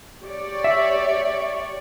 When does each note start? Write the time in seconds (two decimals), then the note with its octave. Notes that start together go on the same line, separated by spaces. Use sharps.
0.22 G4 C#5 D5
0.64 E5